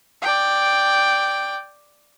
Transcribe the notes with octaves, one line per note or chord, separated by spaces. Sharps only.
D5 G5